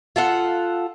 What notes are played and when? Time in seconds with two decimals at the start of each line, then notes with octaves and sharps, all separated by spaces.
0.16 F4 A4 F#5